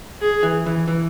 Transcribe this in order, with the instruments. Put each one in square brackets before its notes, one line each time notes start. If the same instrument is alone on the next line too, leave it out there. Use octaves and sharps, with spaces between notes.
[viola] G#4
[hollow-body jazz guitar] E3
E3
E3